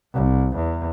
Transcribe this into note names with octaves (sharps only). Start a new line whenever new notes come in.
C2
E2